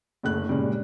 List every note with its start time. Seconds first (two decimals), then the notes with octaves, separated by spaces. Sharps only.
0.23 F#1 D2 F#6
0.49 G2 A#2 C#3 G#3